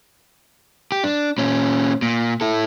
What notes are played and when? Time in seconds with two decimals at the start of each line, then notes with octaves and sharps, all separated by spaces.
0.92 G4
1.04 D4
1.38 A#2 C#4
2.02 A#2
2.41 E4 A4